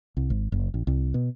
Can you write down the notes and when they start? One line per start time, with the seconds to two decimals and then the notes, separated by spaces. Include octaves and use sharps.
0.17 C2
0.30 G#1
0.52 F#1
0.74 A#1
0.87 C2
1.14 B2